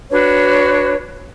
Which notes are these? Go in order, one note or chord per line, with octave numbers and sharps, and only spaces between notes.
D4 F#4 B4 C#5